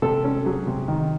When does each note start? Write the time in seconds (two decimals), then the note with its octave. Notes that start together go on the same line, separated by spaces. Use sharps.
0.02 C3 A4
0.24 C#4
0.45 F#3 G#4
0.67 C3
0.88 D#3